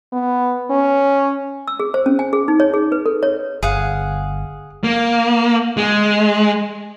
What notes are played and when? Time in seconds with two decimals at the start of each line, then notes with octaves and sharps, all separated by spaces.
0.13 B3
0.70 C#4
1.68 E6
1.80 G#4
1.94 C5
2.06 C#4
2.19 G#5
2.33 G#4
2.48 D#4
2.60 C#5
2.74 G#4
2.92 B4
3.06 A4
3.23 C#5
3.63 G1 G#4 F5 F#5
4.84 A#3
5.77 G#3